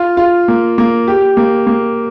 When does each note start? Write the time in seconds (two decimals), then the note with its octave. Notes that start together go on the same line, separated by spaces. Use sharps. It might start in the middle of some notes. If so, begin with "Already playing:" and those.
Already playing: F4
0.17 F4
0.48 A#3
0.78 A#3
1.08 G4
1.37 A#3
1.67 A#3